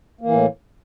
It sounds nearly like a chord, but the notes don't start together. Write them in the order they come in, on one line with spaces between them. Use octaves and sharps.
A#3 E3 A2